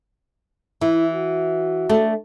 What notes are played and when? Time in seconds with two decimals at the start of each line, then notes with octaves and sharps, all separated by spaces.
0.81 E3 E4
1.13 F#4
1.89 A3 D4